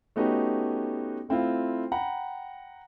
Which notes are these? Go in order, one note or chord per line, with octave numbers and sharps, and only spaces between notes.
A3 B3 C#4 D#4 F#4 G4
A3 C4 E4 F4
F#5 G5 A#5 B5